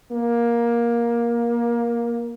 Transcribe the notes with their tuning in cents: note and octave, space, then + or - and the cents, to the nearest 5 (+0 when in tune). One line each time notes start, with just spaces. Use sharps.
A#3 +15